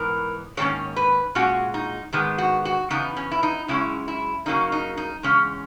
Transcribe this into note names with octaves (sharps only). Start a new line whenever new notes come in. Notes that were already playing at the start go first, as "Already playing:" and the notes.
Already playing: G#2 E3 B3 A#4
G#2 D#3 A#3 C#4 C#5
B4
A#2 G#3 C#4 F#4
D#4
G#2 D#3 G#3 B3
F#4
F#4
E2 C#3 B3 D#4
C#4
E4
D#4
F#2 C#3 G#3 C#4 E4
E4
C#3 F#3 A#3 C#4 D#4
D#4
D#4
E2 C#3 G#3 C#4